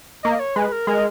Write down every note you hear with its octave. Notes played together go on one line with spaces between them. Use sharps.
A#3 D#5
C#5
G#3 B4
A#4
G#3 A#4